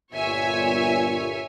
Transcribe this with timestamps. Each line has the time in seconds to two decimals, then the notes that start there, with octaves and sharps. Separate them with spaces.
0.13 G1 A#2 C#5 E5 G#5